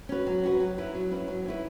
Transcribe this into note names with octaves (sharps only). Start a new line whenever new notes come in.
C#4 F#4 B4
F#3
C#4 F#4 B4
F#3
C#4 E4 B4
F#3
C#4 E4 B4
F#3
C#4 E4 B4